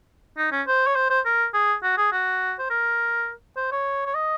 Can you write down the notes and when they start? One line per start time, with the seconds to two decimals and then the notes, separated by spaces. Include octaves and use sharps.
0.37 D#4
0.52 C#4
0.67 C5
0.87 C#5
0.95 C5
1.10 C5
1.25 A#4
1.54 G#4
1.83 F#4
1.97 G#4
2.12 F#4
2.59 C5
2.70 A#4
3.56 C5
3.72 C#5
4.06 C#5
4.14 D#5